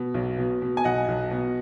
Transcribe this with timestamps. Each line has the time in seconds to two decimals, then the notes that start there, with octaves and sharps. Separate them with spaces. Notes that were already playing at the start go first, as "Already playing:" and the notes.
Already playing: B2
0.14 B1
0.38 B2
0.62 B2
0.77 G#5
0.84 B1 D#5 F#5
1.08 B1
1.31 B2